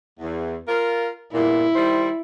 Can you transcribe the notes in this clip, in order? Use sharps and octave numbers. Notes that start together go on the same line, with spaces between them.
E2
F4 A#4
E2 G2 A#2 E4
D#3 G3 C5